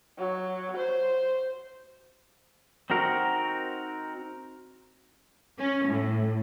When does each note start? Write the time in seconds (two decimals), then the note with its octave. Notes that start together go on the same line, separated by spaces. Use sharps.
0.18 F#3
0.77 C5
2.90 C4 D#4 F#4 A#4
5.58 C#4
5.87 A2